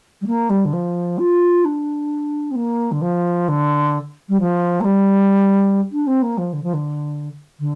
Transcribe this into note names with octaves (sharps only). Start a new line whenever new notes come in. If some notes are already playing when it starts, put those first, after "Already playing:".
G3
A#3
G3
D3
F3
F4
D4
C4
A#3
D3
F3
D3
G3
F3
A#3
G3
D4
C4
A#3
F3
D3
F3
D3
D3